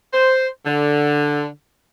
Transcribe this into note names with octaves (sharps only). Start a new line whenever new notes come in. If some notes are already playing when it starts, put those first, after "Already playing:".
C5
D3